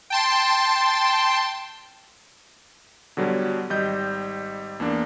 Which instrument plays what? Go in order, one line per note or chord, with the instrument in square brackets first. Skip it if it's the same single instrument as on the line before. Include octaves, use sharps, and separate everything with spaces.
[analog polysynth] G5 A5 C6
[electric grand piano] B2 D3 F#3 G3
G#1 G3 D#5 G6
E2 A#3 D4